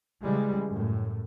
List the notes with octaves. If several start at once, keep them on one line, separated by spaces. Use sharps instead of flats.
C#3 E3 G3 G#3
F#2 A2